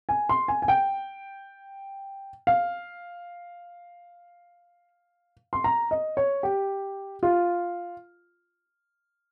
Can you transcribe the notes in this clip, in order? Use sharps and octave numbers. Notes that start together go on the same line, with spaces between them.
G#5
C6
G#5
G#5
G5
F5
C6
A#5
D#5
C#5
G4
F4